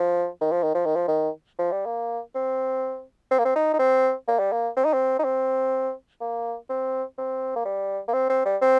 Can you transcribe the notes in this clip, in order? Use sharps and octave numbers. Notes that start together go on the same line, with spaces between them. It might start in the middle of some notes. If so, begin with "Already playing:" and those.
Already playing: F3
D#3
F3
D#3
F3
D#3
F3
D#3
F3
G3
A#3
C4
C4
A#3
C4
D#4
D#4
C4
A#3
G3
A#3
C4
D#4
C4
D#4
C4
A#3
C4
C4
A#3
G3
A#3
C4
C4
G3
C4